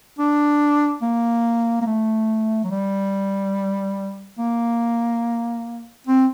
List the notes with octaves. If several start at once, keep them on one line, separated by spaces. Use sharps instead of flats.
D4
A#3
A#3
A3
F#3
G3
A#3
C4